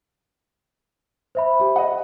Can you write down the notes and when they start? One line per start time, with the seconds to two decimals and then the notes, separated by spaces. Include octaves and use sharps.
1.35 C5 E5 B5
1.60 G4
1.76 D#5 F#5